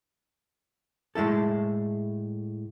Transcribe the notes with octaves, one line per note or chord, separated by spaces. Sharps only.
A2 G#3 A3 E4 A4